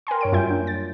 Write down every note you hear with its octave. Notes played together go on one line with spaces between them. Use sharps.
A#4 G5 G#5 C6
G2 C#5 D7
F#2 G3 F4 E5 G#5 G6
A#3 D4
A6